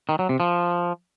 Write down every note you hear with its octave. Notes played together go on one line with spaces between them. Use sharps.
D#3
F#3
C3
F3